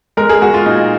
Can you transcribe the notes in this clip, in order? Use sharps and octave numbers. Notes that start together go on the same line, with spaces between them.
G#3 A#4
G#4
G#3 F#4
F4
A#2 D#4